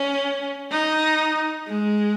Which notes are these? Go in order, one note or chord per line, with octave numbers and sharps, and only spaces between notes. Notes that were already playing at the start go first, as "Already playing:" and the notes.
Already playing: C#4
D#4
G#3